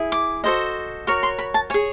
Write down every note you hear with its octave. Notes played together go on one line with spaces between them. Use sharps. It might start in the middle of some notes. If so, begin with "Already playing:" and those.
Already playing: E4 G#4
D6
F#4 A4 C5 D#5
F#4 A#4 C#5 C#6
C6
B5
A5
G#4 C#5 G#5